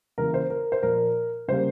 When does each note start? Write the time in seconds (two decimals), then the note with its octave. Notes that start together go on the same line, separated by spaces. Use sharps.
0.18 C#3 E3 A#3 A#4
0.34 C5
0.50 A#4
0.72 C5
0.83 A#2 F3 A#3 A#4
1.48 C#3 G3 A#3 C5